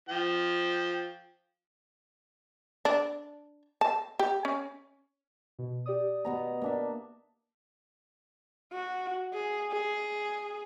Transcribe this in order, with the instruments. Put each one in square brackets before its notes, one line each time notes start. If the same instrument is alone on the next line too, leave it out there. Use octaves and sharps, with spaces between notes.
[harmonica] F3 G5
[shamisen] D4
A5
G4
C#4
[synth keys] B2
G4 D5 D#6
[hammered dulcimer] B2 B3 A#5
A#3 D4 E5
[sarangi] F#4
G#4
G#4